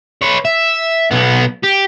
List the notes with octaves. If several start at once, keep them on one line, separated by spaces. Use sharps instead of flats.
B4 C#5
E5
B1 B3
G4